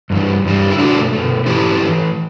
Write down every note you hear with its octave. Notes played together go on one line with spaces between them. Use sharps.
G2 E3 G3
G2 E3 G3
E4
B2 A3 D4 F#4
B2 A3
A2 E3 A3 E4 G4
A2 E3 A3